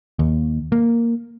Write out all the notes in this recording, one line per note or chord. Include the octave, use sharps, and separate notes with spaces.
D#2
A#3